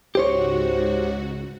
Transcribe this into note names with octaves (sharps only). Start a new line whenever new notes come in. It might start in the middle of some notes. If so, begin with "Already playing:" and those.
C#2 G#2 F#4 G4 C5 C#5